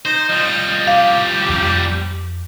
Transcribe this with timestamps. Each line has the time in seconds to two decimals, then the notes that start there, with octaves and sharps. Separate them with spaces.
0.05 D#4 C5
0.29 F3 G3 D#5
0.87 G4 F5
1.49 F2